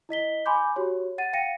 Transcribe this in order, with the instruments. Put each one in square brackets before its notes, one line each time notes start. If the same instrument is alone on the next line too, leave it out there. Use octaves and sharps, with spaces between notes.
[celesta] E4 D#5 B6 G7
G#5 B5 C6 D6 G6
F#4 G4 C#5
F#5 A6 D#7
F5 G5 A#6 C#7 D#7